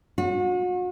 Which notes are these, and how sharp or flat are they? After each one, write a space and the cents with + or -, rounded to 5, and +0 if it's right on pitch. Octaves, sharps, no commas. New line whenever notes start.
F#4 -40